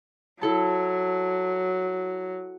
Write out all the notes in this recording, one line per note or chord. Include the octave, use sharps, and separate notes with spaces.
F#3 E4 A4 A5